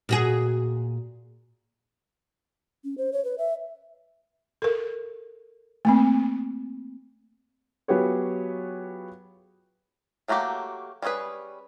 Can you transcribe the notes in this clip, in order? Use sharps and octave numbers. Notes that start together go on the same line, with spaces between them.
A#2 F#4 G#4
C#4
C5
C#5
B4
E5
A4 A#4
A3 A#3 C4
F#3 B3 F4 G4 G#4 C#5
F#3 A3 A#3 F#4 G4
G3 C#4 E4 G#4 B4